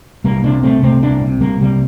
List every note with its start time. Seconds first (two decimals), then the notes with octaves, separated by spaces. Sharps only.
0.24 C2 G3 A#3
0.44 C3 A#3 D4
0.63 C2 A3 C4
0.82 C3 A3 C4
1.02 C2 A#3 D4
1.21 C3
1.41 C2 G3 A#3
1.61 C3 G3 A#3